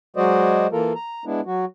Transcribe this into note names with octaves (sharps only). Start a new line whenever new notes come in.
F#3 G#3 F#4 C5 D5 D#5
E3 A#3 F4 A4 A#4
A#5
G#3 B3 D4 E4
F#3 F#4